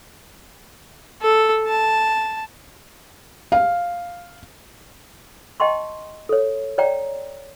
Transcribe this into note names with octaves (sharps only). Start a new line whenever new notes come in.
A4
A5
F5
D#5 G5 A5 C6 C#6
A4 C#5
C#5 D5 G5 A#5